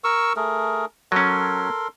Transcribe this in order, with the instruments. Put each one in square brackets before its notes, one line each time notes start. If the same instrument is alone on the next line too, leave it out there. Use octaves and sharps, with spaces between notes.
[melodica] A#4 C#6 E6
A3 G#4 A#4
[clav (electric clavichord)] F#3 C#4 [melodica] A4 A#4 C6